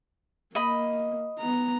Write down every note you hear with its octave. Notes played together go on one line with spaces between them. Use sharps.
A#3 D#5 B5
B3 A#5